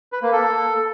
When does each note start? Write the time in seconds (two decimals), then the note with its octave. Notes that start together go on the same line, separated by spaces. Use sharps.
0.12 B4
0.22 A#3
0.32 A4